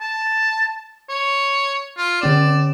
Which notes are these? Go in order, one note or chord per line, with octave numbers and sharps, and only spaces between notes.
A5
C#5
F4
D3 C#4 D5 E7